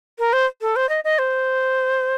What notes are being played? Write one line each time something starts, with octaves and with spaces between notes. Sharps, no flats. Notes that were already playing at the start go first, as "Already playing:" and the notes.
A#4
C5
A4
C5
D#5
D#5
C5